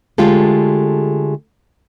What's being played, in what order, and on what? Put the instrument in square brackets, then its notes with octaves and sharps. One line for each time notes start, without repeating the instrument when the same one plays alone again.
[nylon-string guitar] D3 G#3 A3 F4 G4 A4